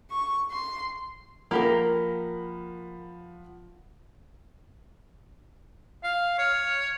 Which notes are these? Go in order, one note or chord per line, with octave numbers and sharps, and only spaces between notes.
C#6
C6
F3 A#3 G4 A#4 F#5 B5
F5 F6
C#5